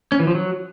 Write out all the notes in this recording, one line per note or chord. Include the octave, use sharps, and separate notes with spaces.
C#4
E3
F3
F#3